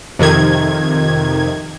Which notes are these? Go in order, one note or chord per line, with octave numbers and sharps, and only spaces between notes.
F2 C3 D#3 G#6